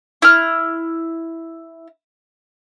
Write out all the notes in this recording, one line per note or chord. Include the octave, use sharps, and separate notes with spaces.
E4 F6